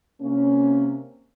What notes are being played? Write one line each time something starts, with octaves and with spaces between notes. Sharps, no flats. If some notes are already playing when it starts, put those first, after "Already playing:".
C3 A#3 C#4